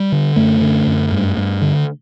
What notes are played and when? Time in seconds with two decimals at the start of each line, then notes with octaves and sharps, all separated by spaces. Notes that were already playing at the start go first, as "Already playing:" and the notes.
Already playing: G3
0.12 D3
0.36 F#2 A3
0.61 D3
0.87 F#2
1.12 G2
1.37 G2
1.62 D3